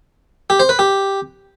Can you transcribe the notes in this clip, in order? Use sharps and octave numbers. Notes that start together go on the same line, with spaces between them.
G4
C5
B4
G4